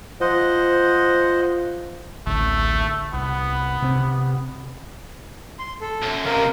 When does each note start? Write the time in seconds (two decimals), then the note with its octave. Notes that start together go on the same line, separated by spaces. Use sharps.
0.21 F3 C5 D#5 F#5
2.27 A1 D2 A3
3.13 C2 B3
3.82 C3 C4
5.59 C6
5.81 A4
6.02 B1 F#2
6.26 C#2 C3 A#4 F5